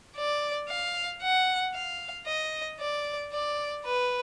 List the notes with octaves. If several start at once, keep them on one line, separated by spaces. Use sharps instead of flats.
D5
F5
F#5
F5
D#5
D5
D5
B4